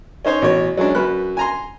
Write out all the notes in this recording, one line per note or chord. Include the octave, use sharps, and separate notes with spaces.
C#4 D#4 C5 C#5
A1 B2 C#5
F#3 G#3 C#4 D4
F#2 B4 F#6
G#5 A#5 C6